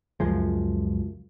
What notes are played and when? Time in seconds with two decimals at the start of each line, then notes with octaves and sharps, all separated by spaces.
0.20 C#2 F#2 F3 G#3